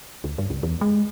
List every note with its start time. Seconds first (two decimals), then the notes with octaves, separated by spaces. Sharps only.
0.24 D2
0.38 G2
0.50 C#2
0.63 E2
0.81 G#3